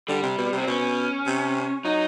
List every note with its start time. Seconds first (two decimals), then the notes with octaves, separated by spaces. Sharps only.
0.08 D3 G3
0.23 C3
0.38 B2
0.52 C3
0.58 C4
0.67 B2 C#4
1.26 C3
1.85 F#3 D#4